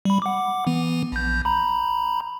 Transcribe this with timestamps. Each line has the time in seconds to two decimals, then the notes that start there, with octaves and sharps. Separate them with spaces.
0.05 G3 B5
0.22 F#5 D6
0.67 E3 B3
1.12 A#1 G6
1.45 A#5 B5